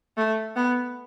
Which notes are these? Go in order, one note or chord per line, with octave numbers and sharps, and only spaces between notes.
A3
B3